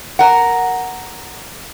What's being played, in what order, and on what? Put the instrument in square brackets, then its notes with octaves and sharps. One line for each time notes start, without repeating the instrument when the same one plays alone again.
[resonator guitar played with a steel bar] A#4 F#5